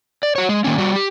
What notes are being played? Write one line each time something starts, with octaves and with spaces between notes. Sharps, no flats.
D5
F#4 C#5
G#3
D#3 A#3 C#4
G3 F#4
G4